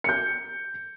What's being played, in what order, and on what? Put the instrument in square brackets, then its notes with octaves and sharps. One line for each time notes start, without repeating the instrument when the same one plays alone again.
[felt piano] G6 C#7